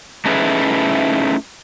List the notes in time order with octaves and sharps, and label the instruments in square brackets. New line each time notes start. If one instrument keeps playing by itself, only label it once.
[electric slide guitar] A3 C#4 D#4 E4 G#4 B4